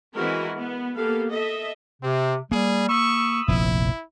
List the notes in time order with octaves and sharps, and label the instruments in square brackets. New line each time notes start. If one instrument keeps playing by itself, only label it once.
[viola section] E3 G#3 C4 E4 F#4 A#4
B3
A#3 B3 G4 A4 F5
A4 D#5 E5
[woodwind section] C3 [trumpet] C4
[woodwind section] G3 [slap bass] A#3 [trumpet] G#4
[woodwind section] B5 D#6 E6 [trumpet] C#6
[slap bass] F1 A#1 F3 [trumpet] E4